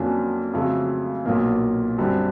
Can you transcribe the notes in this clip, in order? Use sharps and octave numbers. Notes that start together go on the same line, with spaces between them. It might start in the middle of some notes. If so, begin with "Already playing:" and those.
Already playing: F2 D3 F#3 A#3 C#4
F2 C#3 F#3 A3
B1 A#2 F#3 A#3
F#2 D3 G3 C4